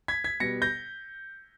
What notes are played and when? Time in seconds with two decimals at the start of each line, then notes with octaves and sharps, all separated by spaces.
0.08 G#6 B6
0.24 G#6 B6
0.40 B2 G3 B3 A#6 C#7
0.62 G6 A#6